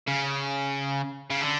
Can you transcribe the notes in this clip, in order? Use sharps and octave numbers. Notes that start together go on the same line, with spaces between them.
C#3
C#3
D3